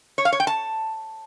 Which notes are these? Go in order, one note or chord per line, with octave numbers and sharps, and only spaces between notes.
C#5
F5
C#5
G5
A5